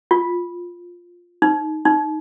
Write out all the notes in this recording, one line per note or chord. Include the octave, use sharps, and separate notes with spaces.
F4
D#4
D#4